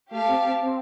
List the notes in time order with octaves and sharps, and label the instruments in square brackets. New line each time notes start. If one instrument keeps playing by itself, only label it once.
[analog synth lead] A3 [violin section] G4 F5 A5
[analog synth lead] C4
C4
C4